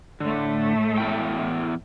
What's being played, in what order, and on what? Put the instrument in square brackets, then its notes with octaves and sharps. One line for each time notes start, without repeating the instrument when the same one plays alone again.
[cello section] A2 A3 [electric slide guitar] D3
[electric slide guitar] E2 E4 G5